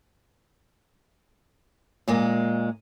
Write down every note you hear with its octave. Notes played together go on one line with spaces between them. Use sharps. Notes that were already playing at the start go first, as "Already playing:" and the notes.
A#2 G#3 A#3